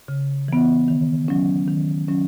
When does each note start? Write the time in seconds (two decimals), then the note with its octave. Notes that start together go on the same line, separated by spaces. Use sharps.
0.08 C#3
0.48 E3 B3
0.88 D#3
1.28 F#3 C#4
1.68 D#3
2.08 F#3 C#4